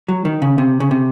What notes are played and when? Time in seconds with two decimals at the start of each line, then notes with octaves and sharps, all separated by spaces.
0.08 F#3
0.25 D#3
0.42 C#3
0.58 C3
0.80 C#3
0.91 C3